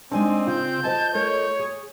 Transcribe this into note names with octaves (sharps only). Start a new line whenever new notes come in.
G#3 C4 D4 D#4 D5 G#5
C#3 F4 G6
C5 D#5 G#5 A5
A3 A#4 C#5 D#5
G#4